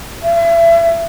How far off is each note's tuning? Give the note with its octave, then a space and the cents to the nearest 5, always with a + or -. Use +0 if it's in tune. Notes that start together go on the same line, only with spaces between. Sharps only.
E5 +35